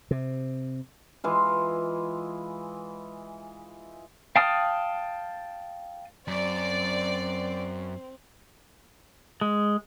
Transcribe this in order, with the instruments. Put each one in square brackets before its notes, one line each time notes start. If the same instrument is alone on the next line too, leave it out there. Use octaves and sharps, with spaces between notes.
[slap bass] C3
[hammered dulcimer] E3 G#3 F4
[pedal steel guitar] F5 G5 A5 D#6 F6
[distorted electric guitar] F#2 [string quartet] C4 [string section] D5
[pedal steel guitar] G#3